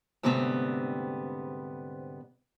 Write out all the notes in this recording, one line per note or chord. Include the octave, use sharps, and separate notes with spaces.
D2 G#2 C3 G3 B3 C4